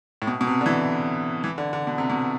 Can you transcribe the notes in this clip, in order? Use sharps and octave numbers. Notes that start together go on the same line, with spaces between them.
A2
B2
B2
C3
D3
E3
E3
D3
D3
B2
C3
B2